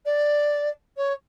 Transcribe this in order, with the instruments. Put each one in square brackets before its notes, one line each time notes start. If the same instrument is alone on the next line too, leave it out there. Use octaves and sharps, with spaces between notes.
[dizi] D5
C#5